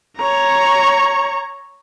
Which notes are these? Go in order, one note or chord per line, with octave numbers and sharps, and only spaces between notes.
C#5 A#5